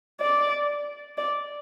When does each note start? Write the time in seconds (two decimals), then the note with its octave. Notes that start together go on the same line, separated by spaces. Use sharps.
0.21 D5
1.18 D5